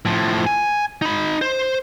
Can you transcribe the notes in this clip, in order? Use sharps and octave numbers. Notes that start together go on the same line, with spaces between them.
A2 F3
G#5
D#4 B5
C5